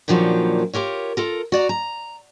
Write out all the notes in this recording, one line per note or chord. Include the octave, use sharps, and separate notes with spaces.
A#2 D3 D#3 F3 F#3 A#3
F4 G4 A#4 C#5
F4 A4 A#4
F#4 D5 A#5
A#5